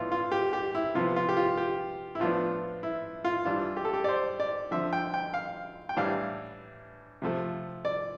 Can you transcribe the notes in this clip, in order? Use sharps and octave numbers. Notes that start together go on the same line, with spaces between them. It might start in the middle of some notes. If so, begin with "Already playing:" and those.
Already playing: A2 E3 B3 D4 E4 F4
F4
G4
G4
E4
C3 F3 B3 F4
F4
G4
F4
G4
E4
A2 F3 B3 D4 F4
E4
F4
E3 G3 D4 F4
G4
A4
G4
D5
C5
D5
D3 F3 C4 E5
G5
G5
F5
G5
A2 E3 G3 D4 F5
C3 F3 A3
D5